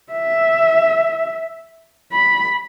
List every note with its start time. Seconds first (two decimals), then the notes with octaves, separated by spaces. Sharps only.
0.12 E5
2.12 B5